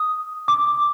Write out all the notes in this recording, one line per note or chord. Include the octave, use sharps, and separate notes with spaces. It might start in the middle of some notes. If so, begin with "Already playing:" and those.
Already playing: D#6
D6